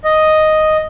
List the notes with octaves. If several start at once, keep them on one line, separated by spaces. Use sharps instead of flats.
D#5